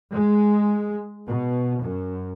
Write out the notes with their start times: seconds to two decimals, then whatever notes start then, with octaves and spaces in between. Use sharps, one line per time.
0.13 G#3
1.27 B2
1.82 F#2